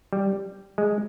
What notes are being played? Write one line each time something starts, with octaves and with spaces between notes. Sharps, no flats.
G3
G#3